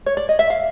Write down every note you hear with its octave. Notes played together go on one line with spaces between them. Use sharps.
C#5
D5
D#5
E5
F5